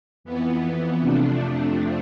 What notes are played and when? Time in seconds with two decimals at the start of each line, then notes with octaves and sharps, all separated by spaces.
0.24 F2 E3 B3
1.00 F2 C3 F3 A3 D4